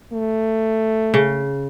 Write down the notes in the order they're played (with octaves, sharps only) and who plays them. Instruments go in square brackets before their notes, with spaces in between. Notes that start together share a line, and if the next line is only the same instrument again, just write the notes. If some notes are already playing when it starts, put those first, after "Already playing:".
[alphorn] A3
[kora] C#3